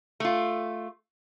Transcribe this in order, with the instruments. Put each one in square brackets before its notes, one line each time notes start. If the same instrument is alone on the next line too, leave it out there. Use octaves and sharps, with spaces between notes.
[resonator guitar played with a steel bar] A3 F4